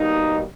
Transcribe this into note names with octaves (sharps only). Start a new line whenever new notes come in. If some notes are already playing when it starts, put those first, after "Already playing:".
Already playing: B2 G3 A#3 D#4